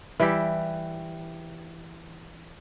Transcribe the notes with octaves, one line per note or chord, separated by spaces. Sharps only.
E3 G3 G4 E5